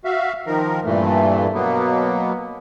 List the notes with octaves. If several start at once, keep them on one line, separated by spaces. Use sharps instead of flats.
F#4 E5 F5
D#3 F3 A#4
G2 A#2 E3 A3
B2 F#3 A#3 B3